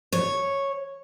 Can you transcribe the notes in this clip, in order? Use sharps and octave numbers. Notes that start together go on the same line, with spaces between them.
C#5